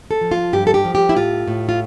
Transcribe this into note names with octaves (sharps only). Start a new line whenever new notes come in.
A4
F3
F4
G2 G4
A4
G4
F3
G4
E4
A2 F4
A2
F4